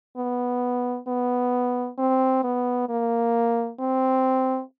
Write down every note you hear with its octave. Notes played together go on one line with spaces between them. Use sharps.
B3
B3
C4
B3
A#3
C4